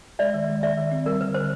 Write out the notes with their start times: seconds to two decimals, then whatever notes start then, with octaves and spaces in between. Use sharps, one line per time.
0.19 G#3 D5 E5
0.34 D#3
0.48 G#3
0.63 D#3 D5 E5
0.77 D#3
0.92 C4
1.06 G3 A#4
1.20 D3 B4
1.34 D3 C5